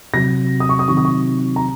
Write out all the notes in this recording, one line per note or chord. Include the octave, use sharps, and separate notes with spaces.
C3 F#3 A#6
D#6
C#6
D#6
C3 D#3 F#3 C#6
D#6
C#6
A#5